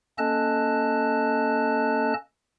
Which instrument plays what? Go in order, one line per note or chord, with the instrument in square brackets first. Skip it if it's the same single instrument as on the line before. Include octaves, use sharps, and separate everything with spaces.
[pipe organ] A#3 C#4 A4 D#5 A5 F#6